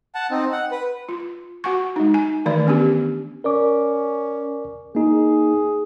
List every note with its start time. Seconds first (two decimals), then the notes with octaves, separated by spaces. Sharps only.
0.15 F#5 A5
0.31 C4 D#4
0.52 F#5
0.71 B4
1.09 F4
1.64 F#4 F#5 G#5 C#6
1.96 G#3 D#4
2.14 G#5
2.46 D#3 E3 A3 D5
2.67 B3 C#4 D4 G4
3.44 C#4 A#4 D5 D6
4.95 A#3 D#4 G#4